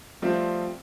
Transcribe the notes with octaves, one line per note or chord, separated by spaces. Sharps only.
F3 G3 A3 C4 F4